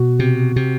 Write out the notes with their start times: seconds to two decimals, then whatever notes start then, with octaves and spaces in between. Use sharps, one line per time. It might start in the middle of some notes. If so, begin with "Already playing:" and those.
Already playing: B2 F#4
0.19 C3
0.56 C3